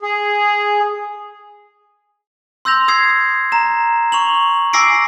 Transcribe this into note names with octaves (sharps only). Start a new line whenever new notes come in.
G#4
C6 E6 G6 A#6 F7
D#6 E6 G#6 C7
A#5 E7
C#6 F7 F#7
G#5 D6 E6 A#6 C7 D7